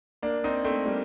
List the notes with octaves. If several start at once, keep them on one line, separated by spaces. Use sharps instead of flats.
A#3 D4
C4 D#4
A3 C4
G3 A#3